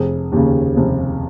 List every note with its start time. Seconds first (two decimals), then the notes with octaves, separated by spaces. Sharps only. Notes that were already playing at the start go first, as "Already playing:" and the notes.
Already playing: F1 G#4
0.32 D#2 C#3
0.77 F1